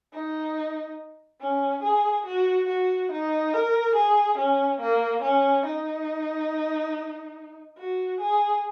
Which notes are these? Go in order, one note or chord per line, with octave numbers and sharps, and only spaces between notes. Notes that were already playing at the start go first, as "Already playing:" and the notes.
D#4
C#4
G#4
F#4
F#4
D#4
A#4
G#4
C#4
A#3
C#4
D#4
F#4
G#4